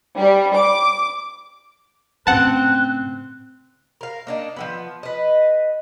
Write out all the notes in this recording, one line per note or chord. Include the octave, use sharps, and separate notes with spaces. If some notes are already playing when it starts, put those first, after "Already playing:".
G3
D6
A2 C#3 C4 F#5 A5 F#6
A#4 F5
A#3 D4 D#4
F3 G3 B3
B4 D#5